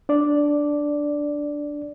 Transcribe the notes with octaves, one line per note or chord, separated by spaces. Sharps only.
D4 D5